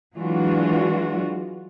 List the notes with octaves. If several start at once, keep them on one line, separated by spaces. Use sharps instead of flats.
E3 F#3 G#3 D4 F4 F#4